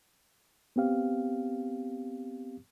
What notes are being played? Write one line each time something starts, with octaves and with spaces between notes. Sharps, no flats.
B3 C4 G4 F5